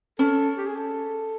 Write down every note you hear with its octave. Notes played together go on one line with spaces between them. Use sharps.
C#4 A4
G4
G#4
A4